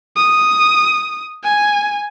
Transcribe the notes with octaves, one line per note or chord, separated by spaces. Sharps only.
D#6
G#5